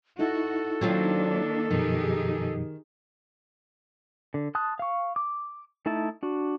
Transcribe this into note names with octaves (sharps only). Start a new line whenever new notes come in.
D#4 E4 F#4 A4
D#3 F#3 A#3 C4 D4 F4
F#2 B2 D#3 F3 D#4 G4 G#4
D3
A5 C6 D#6 F#6
F5 C#6
D6
A3 D#4 E4 A5
D4 F#4